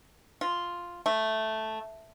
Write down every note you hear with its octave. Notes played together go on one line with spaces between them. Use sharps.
F4
A3